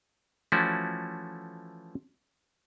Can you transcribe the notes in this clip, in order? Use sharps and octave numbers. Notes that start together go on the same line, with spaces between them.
E3 F3 A3 C#4 E4 F#4